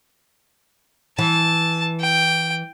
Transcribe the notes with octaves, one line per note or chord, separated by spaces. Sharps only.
E3 A5
G5